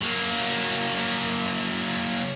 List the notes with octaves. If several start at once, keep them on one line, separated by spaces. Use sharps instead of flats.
F#3 A#3